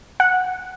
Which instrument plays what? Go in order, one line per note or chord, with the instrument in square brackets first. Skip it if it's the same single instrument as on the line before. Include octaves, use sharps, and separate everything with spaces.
[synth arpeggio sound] F#5